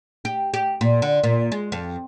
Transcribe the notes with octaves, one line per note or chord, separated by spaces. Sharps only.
G4
G4
A#2
D3
A#2
G#3
F2